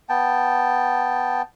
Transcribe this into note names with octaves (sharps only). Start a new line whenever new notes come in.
B3 G5 A5